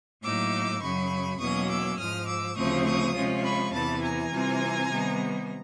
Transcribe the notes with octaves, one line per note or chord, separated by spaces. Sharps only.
A2 F#3 A#3 D#4 D6 E6
F#2 C#3 F#3 B5 C#6
E2 B2 F#3 A#3 C#4 C#6 D#6
D6 E6
G#2 F3 G#3 D#6 F6
D6 E6
D2 C#3 F3 A3 C4 C#6 D#6
C#6 D#6
C3 F3 G#3 C#4 F4
B5 C#6
E2 C3 E3 A5 B5
G#5 A#5
C3 E3 G3 C4 F4
C3 D#3 G3 B3